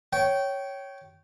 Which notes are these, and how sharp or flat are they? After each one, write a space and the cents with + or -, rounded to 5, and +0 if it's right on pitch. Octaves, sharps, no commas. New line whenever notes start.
C#5 +0 G5 -20